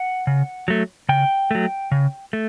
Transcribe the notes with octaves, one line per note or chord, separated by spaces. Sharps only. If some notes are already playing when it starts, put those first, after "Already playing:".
Already playing: F#5
C#3
F#3 A3
C#3 G5
F#3 A3
C#3
A3